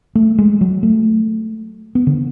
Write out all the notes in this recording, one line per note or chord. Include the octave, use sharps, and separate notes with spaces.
A3
G#3
F#3
A3
B3
D3